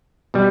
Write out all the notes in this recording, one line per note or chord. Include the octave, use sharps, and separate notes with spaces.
B2 G3